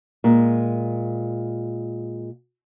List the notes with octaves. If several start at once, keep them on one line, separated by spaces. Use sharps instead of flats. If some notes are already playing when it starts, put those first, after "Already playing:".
A#2 G#3